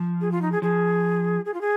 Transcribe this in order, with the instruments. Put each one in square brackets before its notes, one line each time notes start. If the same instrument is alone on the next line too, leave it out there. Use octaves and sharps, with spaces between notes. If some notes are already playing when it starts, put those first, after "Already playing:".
Already playing: [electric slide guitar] F3
[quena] G#4
F4
D#4
G#4
[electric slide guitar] F3 [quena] G#4
[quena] G#4
F4
G#4